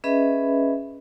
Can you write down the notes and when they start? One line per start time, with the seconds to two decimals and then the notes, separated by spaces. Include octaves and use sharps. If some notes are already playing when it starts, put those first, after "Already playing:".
0.04 C#4 G#4 B4 D#5 E5 B5